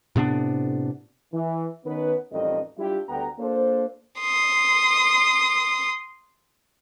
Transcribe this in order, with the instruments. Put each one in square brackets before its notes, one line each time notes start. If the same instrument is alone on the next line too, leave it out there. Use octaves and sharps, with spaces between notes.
[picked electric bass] A2 C3 B3 D4
[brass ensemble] E3
D#3 B3 C#4 D#4 B4
A1 F2 D#3 G3 A4 D#5
G3 D4 E4 F4 G4
D2 G3 B3 G5 A#5
A#3 D4 F4 A4 C5
[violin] C6 D#6